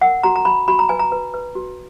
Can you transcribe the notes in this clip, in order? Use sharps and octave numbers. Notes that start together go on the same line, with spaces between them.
A#4 F#5
F#4 A#5
A#5
F#4 B5
F#4 B5
A#5
B4 G#5
A#5
B4
B4
F#4